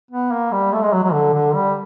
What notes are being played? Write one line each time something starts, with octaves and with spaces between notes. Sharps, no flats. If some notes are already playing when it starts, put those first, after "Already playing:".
B3
A#3
G3
A3
G#3
F#3
F#3
D3
D3
G3